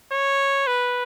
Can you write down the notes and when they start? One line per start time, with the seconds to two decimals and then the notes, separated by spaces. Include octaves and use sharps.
0.12 C#5
0.67 B4